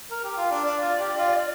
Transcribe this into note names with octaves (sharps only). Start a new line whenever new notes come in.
A#4
G4
F4
D4
D4 D5
F4
G4
F4